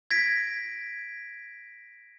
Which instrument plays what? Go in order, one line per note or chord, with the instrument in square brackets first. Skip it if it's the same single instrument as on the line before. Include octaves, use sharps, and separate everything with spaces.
[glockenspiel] G#6 A#6 B6 D7